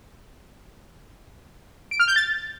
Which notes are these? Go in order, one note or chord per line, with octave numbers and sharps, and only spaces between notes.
D7
F6
G6
A6